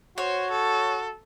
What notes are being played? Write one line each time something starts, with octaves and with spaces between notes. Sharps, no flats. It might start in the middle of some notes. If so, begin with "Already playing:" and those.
F#4 C5 C#5
A4